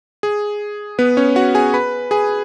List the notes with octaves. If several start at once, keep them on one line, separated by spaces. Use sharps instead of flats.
G#4
B3 B4
C#4 C#5
F#4 F#5
G#4 G#5
B4 B5
G#4 G#5